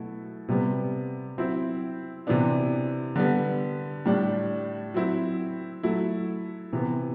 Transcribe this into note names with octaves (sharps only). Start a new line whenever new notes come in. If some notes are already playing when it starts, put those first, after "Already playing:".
Already playing: B2 F#3 A3 E4
C3 G3 B3
F#3 C4 E4
C3 E3 B3 D4
D3 G3 B3
A2 G3 D4
F#3 C4 E4
F#3 A3 E4
C3 E3 B3